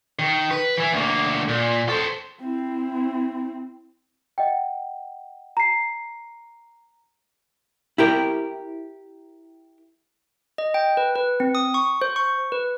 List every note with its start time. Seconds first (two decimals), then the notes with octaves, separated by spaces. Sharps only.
0.19 D#3
0.51 B4
0.77 E3 E4
0.92 D2 A#3
1.48 A#2
1.89 A4 C5
2.41 C4 E4
4.38 D#5 F#5 G5
5.57 A#5 C7
7.98 E4 G4 A#4
10.58 D#5
10.74 G5
10.97 B4
11.16 B4
11.40 C4
11.55 D#6
11.74 C#6
12.02 C5
12.16 C#6
12.52 B4